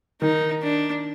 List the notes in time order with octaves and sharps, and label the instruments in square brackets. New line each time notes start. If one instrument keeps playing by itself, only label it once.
[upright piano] D#3 [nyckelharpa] D#4
[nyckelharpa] D4